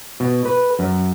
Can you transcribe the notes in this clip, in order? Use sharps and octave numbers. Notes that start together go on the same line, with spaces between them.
B2
B4
F#2